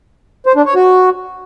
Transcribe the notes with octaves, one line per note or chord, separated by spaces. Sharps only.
C5
D4
C#5
F#4